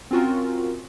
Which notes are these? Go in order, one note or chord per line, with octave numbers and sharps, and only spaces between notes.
C4 C#4 F4 F#4 A#4